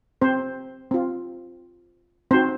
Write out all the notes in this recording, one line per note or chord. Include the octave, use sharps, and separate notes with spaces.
C4 C5
C4 F4
C4 D#4 F#4 C5